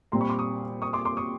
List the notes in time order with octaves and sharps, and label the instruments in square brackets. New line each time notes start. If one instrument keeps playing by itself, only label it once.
[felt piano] A#2 G3 C4 [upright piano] A#5 C6
[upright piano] B5 C#6
C6 D6
C#6 D#6
C#6 D#6
C6 D6
C6 D6
C#6 D#6